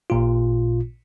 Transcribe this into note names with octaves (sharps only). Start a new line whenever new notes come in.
A1 A#2 F4